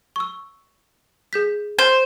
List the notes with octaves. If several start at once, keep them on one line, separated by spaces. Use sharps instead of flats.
C#6 E6
G#4 G6 B6
C5